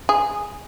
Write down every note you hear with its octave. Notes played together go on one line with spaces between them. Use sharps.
G#4